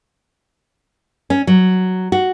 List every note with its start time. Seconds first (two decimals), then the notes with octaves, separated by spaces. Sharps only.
1.30 C#4
1.47 F#3
2.12 F#4